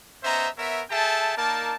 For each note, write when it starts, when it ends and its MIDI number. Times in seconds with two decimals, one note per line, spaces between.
0.23 0.48 59
0.23 0.48 61
0.23 0.48 72
0.23 0.48 75
0.23 0.48 76
0.23 0.48 82
0.58 0.82 59
0.58 0.82 70
0.58 0.82 73
0.58 0.82 76
0.90 1.34 68
0.90 1.34 69
0.90 1.34 76
0.90 1.34 79
0.90 1.34 81
1.36 1.76 58
1.36 1.76 63
1.36 1.76 70
1.36 1.76 74
1.36 1.76 81